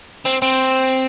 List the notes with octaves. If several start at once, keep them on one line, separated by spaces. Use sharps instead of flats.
C4
C4